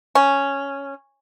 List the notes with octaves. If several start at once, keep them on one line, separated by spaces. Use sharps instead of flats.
C#4